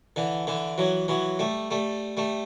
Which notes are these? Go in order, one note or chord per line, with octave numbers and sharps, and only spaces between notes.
D3 E3
D3 E3
E3 F#3
E3 F#3
G3 A3
G3 A3
G3 A3